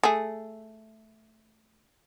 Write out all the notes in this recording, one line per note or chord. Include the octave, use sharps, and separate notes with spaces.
A3 G#4